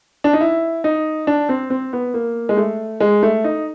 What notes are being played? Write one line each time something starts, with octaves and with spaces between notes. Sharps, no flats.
D4
D#4
E4
D#4
D4
C4
C4
B3
A#3
G#3
A3
G#3
A3
D#4